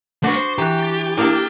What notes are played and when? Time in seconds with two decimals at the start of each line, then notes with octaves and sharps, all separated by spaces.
0.23 A3 D4 F#4 B4
0.36 C5
0.58 E3 G4 A#5 F#6
0.82 A6
1.17 A#3 D4 E4 A4